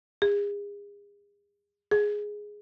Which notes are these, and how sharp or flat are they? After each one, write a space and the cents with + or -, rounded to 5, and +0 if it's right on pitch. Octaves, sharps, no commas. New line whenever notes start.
G#4 -35
G#4 +0